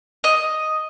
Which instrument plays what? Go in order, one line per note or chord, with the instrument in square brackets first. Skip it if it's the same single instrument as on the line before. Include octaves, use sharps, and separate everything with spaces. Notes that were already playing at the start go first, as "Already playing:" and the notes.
[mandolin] D#5